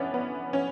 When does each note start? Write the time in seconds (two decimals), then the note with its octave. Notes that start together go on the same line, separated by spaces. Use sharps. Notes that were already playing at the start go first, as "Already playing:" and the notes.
Already playing: B3 C#4 D4 E4
0.14 B3
0.53 C#4